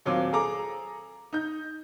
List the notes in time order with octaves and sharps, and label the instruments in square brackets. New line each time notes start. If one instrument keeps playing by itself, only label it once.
[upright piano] D#1 F#3 C4 F4 D6
G#4 A4 A#5 D6
D#4 G6